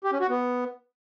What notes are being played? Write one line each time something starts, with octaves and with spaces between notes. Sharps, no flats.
G4
C#4
F#4
B3